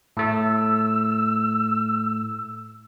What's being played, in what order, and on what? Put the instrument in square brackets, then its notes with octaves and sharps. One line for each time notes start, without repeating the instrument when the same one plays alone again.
[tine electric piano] A2 A3 [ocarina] E6